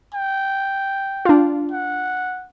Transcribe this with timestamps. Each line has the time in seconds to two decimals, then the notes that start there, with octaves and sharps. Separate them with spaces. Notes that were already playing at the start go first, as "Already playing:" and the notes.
0.15 G5
1.25 D4 F4
1.72 F#5